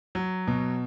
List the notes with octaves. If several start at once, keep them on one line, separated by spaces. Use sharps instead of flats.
F#3
B2